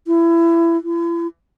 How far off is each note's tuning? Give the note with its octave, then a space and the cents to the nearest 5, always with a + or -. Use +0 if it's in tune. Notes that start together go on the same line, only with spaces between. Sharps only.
E4 +25
E4 +40